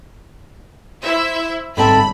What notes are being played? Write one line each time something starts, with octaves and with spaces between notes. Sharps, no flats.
E4 C5 E5
G1 G#2 C4 A4 E5 B5